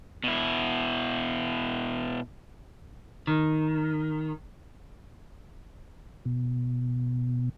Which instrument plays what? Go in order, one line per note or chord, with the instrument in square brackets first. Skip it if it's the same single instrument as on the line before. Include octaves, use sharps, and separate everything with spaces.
[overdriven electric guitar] B2 E4
[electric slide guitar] D#3
[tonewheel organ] B2